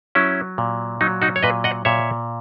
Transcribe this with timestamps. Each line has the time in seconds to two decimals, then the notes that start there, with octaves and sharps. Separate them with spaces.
0.15 F#3 C#4 E4
0.58 A#2
1.01 F#3 D#4
1.22 D#4 F#4
1.36 C#5
1.43 A#2 B4 D#5
1.64 D#5 F#5
1.85 A#2 C#5 E5